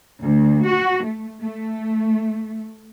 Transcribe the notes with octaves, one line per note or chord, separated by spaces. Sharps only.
D2
F#4
A3
A3